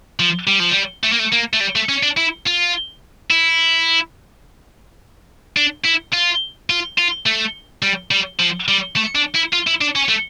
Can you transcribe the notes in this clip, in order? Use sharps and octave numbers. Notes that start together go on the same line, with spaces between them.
F3
G3
F3
G3
A3
A#3
A3
A#3
A3
G3
A3
C#4
D4
E4
F4
E4
D4
E4
F4
F4
F4
A3
G3
G3
F3
G3
A3
D4
E4
F4
E4
D4
C#4
A3